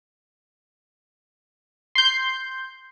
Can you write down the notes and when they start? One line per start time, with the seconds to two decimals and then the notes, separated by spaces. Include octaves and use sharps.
1.95 C6 G6